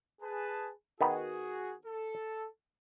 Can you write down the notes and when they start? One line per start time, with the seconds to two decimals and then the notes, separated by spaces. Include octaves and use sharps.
0.21 G#4 B4 A5
1.01 D#3 B3 F#4 G#4
1.86 A4